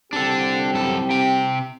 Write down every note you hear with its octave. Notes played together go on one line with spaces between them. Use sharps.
C2 C4 D4 G4 A4
F#2 A4
C3 G5